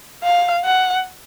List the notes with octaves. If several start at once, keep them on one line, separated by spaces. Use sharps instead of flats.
F5
F#5